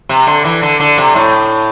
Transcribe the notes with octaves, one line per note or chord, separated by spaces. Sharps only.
C3
D3
E3
D3
D3
C3
A2